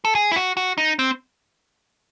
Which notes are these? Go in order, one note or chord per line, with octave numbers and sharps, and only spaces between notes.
A4
G#4
E4
F#4
F#4
D#4
C4